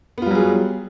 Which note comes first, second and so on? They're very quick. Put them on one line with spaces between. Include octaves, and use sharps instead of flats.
B3 F4 G3 F#3 G#4